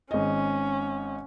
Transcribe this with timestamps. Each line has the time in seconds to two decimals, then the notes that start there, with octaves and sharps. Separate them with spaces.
0.11 G#1 C#4 D#5